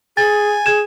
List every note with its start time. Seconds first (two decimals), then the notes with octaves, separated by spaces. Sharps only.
0.17 G#4 G#5 A6
0.66 G#4 G#6 E7